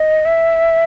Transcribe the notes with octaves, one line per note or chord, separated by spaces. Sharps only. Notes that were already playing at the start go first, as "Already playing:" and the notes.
Already playing: D#5
E5